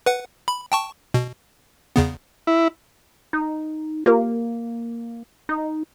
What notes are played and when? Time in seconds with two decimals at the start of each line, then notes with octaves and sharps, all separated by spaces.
0.06 B4 F#5
0.48 B5
0.72 G5 A5 C#6
1.14 B2
1.96 E2 C#3 B3
2.47 E4
3.33 D#4
4.06 A#3 F4 G4 A#4
5.49 D#4